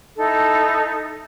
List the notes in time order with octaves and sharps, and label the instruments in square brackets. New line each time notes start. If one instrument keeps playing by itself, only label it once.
[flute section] D#4 E4 A4